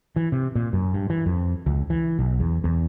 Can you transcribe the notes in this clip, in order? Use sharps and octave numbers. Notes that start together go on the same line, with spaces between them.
E3
C3
A#2
F#2
G2
E3
F2
C#2
E3
B1
E2
E2